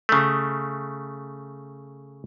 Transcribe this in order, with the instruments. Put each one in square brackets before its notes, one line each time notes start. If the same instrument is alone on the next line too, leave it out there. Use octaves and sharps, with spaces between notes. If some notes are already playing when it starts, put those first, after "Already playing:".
[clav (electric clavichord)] C#3 A3